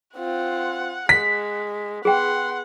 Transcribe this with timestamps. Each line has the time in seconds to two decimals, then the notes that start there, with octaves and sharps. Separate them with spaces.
0.17 C4 F4 F#5
1.09 G#3 B6
2.05 B3 G#4 F#5 G5 C6